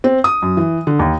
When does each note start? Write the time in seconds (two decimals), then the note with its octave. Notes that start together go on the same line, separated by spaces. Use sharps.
0.04 C4
0.24 D#6
0.42 F#2
0.57 E3
0.87 D3
0.99 D#2